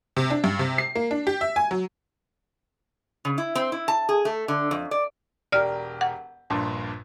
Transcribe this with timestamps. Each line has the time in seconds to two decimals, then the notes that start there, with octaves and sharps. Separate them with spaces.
0.17 C3
0.30 D4
0.44 G2
0.59 C3
0.78 C7
0.95 A#3
1.11 D4
1.27 G4
1.41 E5
1.56 G#5
1.71 F#3
3.25 C#3
3.38 E4
3.55 C4
3.72 E4
3.88 A5
4.09 G#4
4.25 A3
4.48 D3
4.71 F2
4.91 D5
5.52 E1 G4 A#4 D5 F6
6.01 F#5
6.50 A#1 G2 A#2